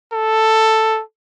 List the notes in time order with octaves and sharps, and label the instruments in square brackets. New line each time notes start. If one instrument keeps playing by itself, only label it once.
[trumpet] A4